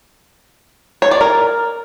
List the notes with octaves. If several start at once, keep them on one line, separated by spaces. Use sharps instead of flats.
C#5
D5
A#4